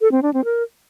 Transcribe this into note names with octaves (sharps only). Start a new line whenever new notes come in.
A4
C4
D4
C4
A#4